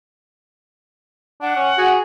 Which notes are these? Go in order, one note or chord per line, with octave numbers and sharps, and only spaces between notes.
D4 F#5
C#4
F#4 G#4